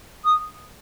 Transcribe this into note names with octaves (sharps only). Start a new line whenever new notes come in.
D#6